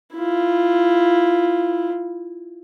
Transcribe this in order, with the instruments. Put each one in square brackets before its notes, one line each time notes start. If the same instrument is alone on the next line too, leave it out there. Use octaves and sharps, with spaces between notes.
[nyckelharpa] E4 F4